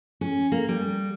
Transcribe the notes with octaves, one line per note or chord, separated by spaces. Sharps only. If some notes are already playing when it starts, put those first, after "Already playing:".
C#4
A#3
G3